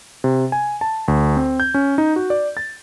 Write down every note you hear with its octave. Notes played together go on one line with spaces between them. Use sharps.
C3
G#5
A5
D2
C4
G6
C#4
D#4
F#4
D5
A6